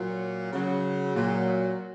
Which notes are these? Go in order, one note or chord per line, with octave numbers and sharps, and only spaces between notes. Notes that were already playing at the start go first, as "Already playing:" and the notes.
Already playing: A#2 F#3
C#3 F#3
A#2 F#3